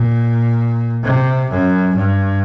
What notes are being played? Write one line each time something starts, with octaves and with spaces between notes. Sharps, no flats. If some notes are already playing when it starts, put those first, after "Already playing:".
Already playing: A#2
C3
F#2
G2